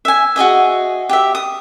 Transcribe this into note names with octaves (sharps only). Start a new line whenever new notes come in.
E5 G#5
F#4 G#4 D#5 E5
G4 E5
D#6